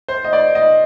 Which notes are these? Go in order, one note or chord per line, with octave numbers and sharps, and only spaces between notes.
C5
D#5
D5
D#5